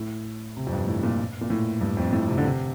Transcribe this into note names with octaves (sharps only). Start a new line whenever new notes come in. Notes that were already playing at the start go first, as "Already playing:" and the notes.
Already playing: A2
C3
F2
G2
A2
A#2
A#2
A2
G2
F2
A2
C3
D3
C3